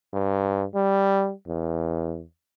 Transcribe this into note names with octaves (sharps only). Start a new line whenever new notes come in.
G2
G3
E2